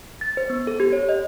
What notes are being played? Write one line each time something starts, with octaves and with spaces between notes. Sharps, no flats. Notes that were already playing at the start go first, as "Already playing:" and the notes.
A6
C5
B3
A4
G4
C#5
D#5